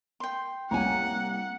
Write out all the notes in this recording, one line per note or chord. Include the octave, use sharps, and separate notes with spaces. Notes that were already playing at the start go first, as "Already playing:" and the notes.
G5 C6
C2 A#3 C#5 F#5 G#5 A#5